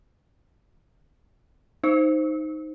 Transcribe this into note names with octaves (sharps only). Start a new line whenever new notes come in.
D#4 C5